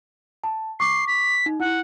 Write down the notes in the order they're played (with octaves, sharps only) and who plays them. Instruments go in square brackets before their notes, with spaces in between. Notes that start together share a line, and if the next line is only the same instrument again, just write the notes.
[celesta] A5
[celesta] C#6 D6 [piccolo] C7
[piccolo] B6
[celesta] D#4
[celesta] E4 [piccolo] F#5